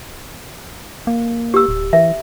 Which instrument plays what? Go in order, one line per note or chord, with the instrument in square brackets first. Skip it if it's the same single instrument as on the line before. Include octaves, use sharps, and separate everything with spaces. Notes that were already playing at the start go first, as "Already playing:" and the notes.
[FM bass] A#3
[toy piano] G4 E6
[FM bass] D1
[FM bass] E3 [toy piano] E5